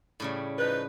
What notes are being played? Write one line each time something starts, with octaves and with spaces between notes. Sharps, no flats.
A2 C#3 G3
F3 D#4 B4